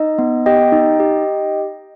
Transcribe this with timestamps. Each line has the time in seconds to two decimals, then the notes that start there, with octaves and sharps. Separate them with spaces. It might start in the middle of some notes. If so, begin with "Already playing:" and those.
Already playing: D#4 D#5
0.18 B3
0.46 G4 D#5 G5
0.72 D#4
1.00 G4